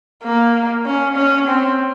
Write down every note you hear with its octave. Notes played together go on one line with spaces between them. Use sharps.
A#3
C#4
C#4
C4